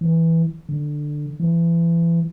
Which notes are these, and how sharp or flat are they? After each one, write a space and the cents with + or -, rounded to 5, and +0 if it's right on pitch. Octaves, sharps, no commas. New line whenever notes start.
E3 -5
D3 +10
E3 +30